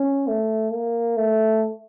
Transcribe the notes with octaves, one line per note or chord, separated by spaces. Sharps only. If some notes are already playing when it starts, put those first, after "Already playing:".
Already playing: C#4
A3
A#3
A3